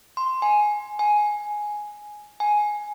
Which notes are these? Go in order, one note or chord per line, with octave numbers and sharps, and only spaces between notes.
C6
G#5
G#5
G#5